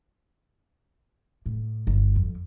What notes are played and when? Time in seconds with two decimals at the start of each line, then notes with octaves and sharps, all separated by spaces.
1.46 A2
1.87 G1
2.16 F2